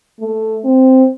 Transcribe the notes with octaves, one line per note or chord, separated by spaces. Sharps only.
A3
C4